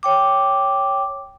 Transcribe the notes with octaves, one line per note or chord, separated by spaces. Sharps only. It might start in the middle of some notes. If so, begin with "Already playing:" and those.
C#5 G5 D6